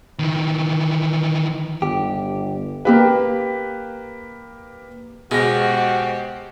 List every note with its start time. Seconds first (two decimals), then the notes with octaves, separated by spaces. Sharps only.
0.19 D#3 E3
1.82 G1 G4
2.85 A#3 G4 B4
5.31 B2 G#3 F#4 G4 C5 A#6